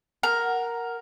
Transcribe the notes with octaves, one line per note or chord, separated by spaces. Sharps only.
A#4 F#5